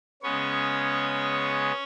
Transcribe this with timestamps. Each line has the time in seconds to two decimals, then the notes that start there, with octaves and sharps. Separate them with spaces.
0.23 C#3 G#3 B3 C#4 C#5